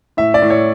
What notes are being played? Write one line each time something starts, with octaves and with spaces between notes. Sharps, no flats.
A2 E5
D5
A2
C#5